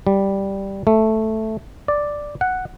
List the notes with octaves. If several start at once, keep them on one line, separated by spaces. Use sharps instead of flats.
G3
A3
D5
F#5